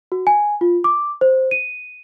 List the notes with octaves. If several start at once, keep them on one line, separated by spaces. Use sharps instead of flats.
F#4
G#5
F4
D6
C5
D#7